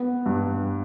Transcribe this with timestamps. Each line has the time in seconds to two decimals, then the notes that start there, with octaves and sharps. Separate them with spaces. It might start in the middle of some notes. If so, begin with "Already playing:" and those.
Already playing: B3
0.26 G2